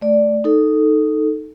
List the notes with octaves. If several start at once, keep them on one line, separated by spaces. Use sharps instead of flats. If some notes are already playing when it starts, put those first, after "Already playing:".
A3 D5
D#4 A4